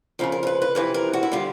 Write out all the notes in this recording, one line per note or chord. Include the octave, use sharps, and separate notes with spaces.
F2 C#3 F3 A#4
A#4
A#4
B4
B4
F2 C3 E3 B4
A#4
F#4
E4
D3 G3 F4